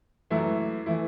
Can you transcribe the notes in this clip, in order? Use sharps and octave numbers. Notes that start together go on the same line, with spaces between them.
F#2 E3 A3 E4
E3 A3 E4